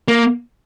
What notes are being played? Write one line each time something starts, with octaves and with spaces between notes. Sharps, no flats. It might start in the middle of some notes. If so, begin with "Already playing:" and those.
A#3